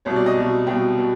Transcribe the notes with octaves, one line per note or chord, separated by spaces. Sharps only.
C2 B2 F#3 C#5
D5
D#5
C2 B2 F#3
C2 B2 F#3 G5
B2